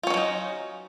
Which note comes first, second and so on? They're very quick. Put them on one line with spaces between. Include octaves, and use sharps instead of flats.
F4 C#4 D#3 F#3 D#4